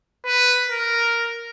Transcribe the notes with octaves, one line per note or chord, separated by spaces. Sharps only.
B4
A#4